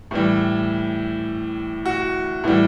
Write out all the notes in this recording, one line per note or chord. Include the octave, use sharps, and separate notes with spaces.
A2 E3 G3
F#4
A2 E3 G3